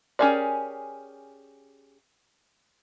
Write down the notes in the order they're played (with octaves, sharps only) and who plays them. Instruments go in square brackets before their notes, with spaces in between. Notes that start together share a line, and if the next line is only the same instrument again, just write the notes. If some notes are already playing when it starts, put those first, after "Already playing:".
[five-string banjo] C#4 G4 G#4 A#4 D5